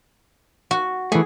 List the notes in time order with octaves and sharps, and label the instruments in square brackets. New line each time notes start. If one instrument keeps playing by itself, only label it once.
[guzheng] F#4
[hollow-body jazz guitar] E3 A3 [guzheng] G#4